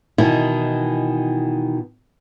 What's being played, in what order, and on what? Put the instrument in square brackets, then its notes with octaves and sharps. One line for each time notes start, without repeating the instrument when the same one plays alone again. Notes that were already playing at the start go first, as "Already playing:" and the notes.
[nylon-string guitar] B2 D#3 E3 D#4 E4